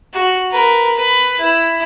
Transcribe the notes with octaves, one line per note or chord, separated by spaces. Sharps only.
F#4
A#4 B4
B4
E4